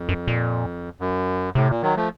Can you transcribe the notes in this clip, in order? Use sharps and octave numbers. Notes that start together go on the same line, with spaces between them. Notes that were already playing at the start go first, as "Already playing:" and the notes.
Already playing: F2
F#2
A#2
F#2
A2 C3
A#2
D#3 F#3
F3 A3